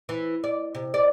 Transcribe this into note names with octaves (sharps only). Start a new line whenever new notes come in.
E3
D5
C3
D5